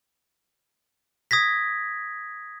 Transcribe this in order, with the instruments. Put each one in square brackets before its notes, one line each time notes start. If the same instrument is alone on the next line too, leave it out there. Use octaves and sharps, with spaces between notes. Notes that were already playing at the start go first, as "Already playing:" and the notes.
[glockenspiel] D#6 G#6 A#6 B6